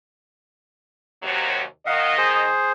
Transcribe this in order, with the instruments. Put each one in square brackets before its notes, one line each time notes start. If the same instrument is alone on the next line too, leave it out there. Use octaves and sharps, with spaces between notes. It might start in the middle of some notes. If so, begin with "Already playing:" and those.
[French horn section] D#2 C3 F#3
[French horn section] D#3 D#5 [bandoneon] F5 F#5
[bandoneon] G#4 C5